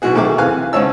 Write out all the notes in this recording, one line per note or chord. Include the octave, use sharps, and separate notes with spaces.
B1 E3 F#4 G#4
B1 D#3 A3 A#3 G#4 D6
C3 E3 F5 G#5 F#6
G#1 C#3 G#4 C#5 A5 E6